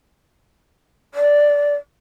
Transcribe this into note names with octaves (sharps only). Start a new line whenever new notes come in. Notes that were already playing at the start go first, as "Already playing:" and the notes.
D5